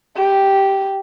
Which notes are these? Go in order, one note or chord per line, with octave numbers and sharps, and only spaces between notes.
G4